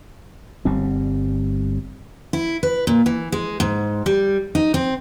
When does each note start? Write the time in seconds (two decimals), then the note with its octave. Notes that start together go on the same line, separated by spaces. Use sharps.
0.65 G1 G3 C4
2.33 E4
2.63 B4
2.87 A#2
3.06 E3
3.32 G#3
3.60 G#2
4.06 G3
4.55 D#4
4.74 C4